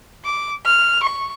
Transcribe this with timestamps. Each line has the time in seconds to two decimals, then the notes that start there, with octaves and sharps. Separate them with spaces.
0.25 D6
0.65 F6
1.03 C#6